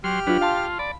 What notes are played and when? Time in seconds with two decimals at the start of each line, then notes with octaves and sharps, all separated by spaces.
0.04 F#3 G4 C6 F6
0.27 F#3 D4 F4 B4
0.41 F4 F5 A5 C6
0.79 D5 B5